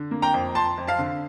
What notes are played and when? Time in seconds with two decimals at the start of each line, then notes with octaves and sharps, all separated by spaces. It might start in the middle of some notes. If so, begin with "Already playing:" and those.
Already playing: D3
0.11 A#3
0.22 G5 A#5
0.34 F2
0.55 F2 A5 C6
0.78 F2
0.87 F5 A5
0.99 D3